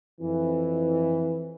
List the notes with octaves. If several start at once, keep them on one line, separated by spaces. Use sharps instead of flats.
F2 E3